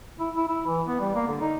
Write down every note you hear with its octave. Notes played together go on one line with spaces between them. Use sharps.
E4
E4
E4
E3
B3
G3
A#3
D3
D#4